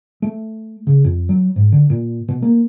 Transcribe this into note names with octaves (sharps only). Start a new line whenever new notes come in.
A3
C#3
F2
F#3
G#2
D3
A#2
B2
A#3